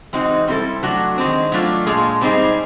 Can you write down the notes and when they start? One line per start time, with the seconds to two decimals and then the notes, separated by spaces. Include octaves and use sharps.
0.13 E3 G#3 C4 D#4 F#4
0.47 G3 C4 E4 A4
0.83 F#3 A3 D4 F#4
1.18 D#3 G#3 C4
1.52 F#3 A3 D4 F4
1.87 A#2 F3 G#3
2.21 G3 C4 D#4 G#4